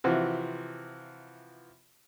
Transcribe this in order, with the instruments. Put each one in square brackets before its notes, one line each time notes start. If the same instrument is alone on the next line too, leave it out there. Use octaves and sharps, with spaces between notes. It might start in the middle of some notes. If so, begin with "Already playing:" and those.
[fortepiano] C3 E3 F3 F#4